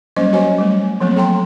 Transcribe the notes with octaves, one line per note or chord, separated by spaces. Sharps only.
F#3 G3 A#3 C#4 C5 D#5
F#4 C5 C#5 D#5 G#5
G3 A3
F3 F#3 A3 A#3 C4
A4 G5 A#5 C6